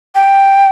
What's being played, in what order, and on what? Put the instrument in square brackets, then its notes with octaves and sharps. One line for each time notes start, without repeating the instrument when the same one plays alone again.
[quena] G5